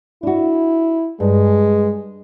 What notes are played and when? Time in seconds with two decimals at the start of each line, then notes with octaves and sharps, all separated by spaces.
0.23 D4 E4 F#4
1.20 G2 G#3